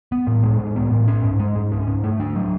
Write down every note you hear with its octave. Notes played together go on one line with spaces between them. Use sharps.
B3
A2
G#3
A2
B3
A2
C#4
G#2
G#3
G#2
C#4
G#2
A3
D4
F#3